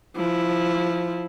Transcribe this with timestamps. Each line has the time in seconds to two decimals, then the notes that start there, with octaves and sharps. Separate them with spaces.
0.16 F3 E4